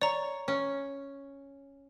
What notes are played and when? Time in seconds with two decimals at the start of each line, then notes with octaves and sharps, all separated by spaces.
0.01 C#5 D5 A#5
0.48 C#4